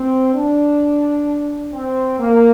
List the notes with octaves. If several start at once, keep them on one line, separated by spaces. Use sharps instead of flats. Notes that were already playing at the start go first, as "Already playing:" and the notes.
Already playing: C4
D4
C4
A#3